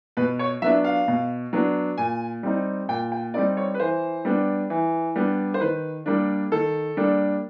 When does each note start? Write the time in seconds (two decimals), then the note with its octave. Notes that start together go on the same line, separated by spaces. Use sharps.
0.17 B2 B4
0.39 C#5
0.62 F#3 B3 D4 E5
0.84 F5
1.08 B2
1.53 F#3 B3 D4
1.98 A#2 G#5
2.43 G3 C4 D#4
2.89 A#2 G5
3.12 G5
3.34 G3 C4 D#4 D5
3.57 C#5
3.74 B4
3.80 E3 C5
4.25 G3 B3 D4
4.70 E3
5.16 G3 B3 D4
5.54 C5
5.61 D#3 B4
6.06 G3 A#3 D4
6.52 D#3 A4
6.97 G3 A#3 D4